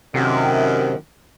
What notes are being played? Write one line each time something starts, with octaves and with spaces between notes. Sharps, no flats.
F#2 A2 C3 D#3